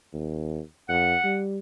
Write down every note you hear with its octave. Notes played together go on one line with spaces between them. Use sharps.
D#2
F2 F#5
G3